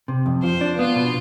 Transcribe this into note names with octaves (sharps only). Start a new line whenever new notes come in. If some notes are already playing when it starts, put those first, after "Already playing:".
C3
F2
F3 C5
D4
B3 F4
B2